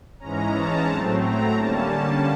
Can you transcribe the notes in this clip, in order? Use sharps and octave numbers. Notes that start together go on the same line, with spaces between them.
G#2 E3 G#3 C#4 A#5
A5
A2 F#3 A3 C4 A5
A#5
D3 G3 A#3 C#4 A5